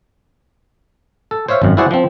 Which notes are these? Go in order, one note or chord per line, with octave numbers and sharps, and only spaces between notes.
A4
C5 C#5 E5 F5
G#1 F#2
E4 F#4 G#4 C5 D5 F#5
F3 C4